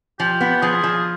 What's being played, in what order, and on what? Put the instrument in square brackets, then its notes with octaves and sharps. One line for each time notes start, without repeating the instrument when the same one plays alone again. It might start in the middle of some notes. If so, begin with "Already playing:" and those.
[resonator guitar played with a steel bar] F3 [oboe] G4
[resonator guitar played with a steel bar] B3
[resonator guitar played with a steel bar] F3 [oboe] G#4
[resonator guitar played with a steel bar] F3